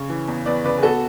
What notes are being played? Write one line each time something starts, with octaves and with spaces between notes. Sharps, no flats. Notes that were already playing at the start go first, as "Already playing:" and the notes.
Already playing: C#3 C#5
E3
E2
E2 B4 D5
C#3 B4 D5
G#4
B3 F#4 A4